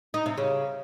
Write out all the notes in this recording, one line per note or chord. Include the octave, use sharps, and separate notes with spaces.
D#4
C3
C#3